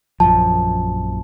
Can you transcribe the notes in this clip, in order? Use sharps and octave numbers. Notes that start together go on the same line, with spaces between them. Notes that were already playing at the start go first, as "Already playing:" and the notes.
A#1 F#2 F3 A5